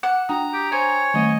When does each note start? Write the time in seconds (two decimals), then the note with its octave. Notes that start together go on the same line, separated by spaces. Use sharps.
0.03 F#5 D6 C#7 E7
0.29 D4 G5 A#5 D#6
0.53 G4
0.72 C5 C#5 G#5
1.14 D#3 A3 D#5